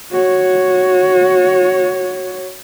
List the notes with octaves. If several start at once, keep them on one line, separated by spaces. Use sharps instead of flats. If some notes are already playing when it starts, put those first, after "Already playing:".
F#4 C#5